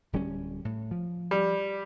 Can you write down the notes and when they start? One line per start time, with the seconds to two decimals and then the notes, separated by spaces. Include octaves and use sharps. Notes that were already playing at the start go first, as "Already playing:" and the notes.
0.13 D1 G3 C#4
0.65 A2
0.91 F3
1.31 G3